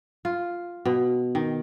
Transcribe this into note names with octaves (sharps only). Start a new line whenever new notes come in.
F4
B2
D#3